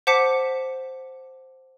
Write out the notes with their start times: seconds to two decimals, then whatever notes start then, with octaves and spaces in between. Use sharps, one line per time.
0.07 C5 F#5 A5 D6 B6 C#7